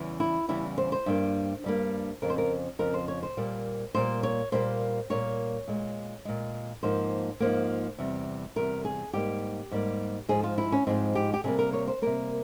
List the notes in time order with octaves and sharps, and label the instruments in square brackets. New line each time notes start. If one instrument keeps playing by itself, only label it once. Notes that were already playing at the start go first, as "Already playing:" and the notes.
Already playing: [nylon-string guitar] E2 C#3 E3 G3
E4
E2 C#3 E3 G3 E4
C5
C5
G2 G3 A#3
G2 G3 A#3
F2 C#3 F3 A#4
C5
A#4
F2 C#3 F3 A#4
C5
C#5
C5
A#2 G3 A#3
A#2 G3 A#3 C5
C#5
A#2 G3 A#3 C5
A#2 G3 A#3 C#5
A#2 G#3
A#2 G#3
G#2 F3 A#3 C5
G#2 F3 A#3
E2 C3 G3
E2 C3 G3 A#4
G#4
G#2 G3 A#3 G4
G#2 G3 A#3
G#2 F3 G#3 G#4
F4
E4
C#4
G#2 F3 G#3 C4
G4
G4
C3 G3 A#3 G#4
A#4
C#5
C5
C3 G3 A#3 A#4